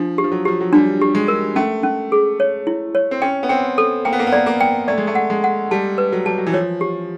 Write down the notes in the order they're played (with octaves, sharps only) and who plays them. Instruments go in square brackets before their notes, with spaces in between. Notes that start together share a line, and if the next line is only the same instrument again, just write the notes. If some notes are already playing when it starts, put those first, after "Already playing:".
Already playing: [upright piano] F3 [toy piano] D4
[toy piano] G4
[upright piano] F3
F#3
[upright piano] F3 [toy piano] G4
[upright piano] F#3
[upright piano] G3 [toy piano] D4
[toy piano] G4
[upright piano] G#3
[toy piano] A#4
[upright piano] A3 [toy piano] C#4
[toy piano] C#4
G#4
C#5
E4
C#5
[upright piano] C4
[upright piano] C#4 [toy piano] G5
[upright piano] B3
[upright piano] C4 [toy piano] G5
[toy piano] A4
[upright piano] A#3 [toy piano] G5
[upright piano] B3
A#3
B3
[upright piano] A#3 [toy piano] D5
[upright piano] A#3
[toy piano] G5
[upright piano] A3 [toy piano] D5
[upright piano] G#3
A3
[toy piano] F#5
[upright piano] G#3
[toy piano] F#5
[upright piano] G3 [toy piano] A5
[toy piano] B4
[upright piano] F#3
[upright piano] G3 [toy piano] A5
[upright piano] F#3
E3
[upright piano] F3 [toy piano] C#5
[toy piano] G4